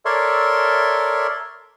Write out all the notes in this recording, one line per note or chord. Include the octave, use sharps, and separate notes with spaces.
A4 A#4 C#5 D5 E5 C6